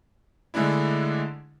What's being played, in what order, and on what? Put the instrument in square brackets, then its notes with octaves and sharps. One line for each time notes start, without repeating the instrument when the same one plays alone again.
[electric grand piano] D3 G#3 A3 D4 E4